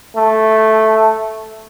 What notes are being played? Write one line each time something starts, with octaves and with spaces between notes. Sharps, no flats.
A3